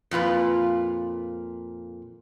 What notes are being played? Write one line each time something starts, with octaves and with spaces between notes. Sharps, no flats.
F2 A#2 F4 B4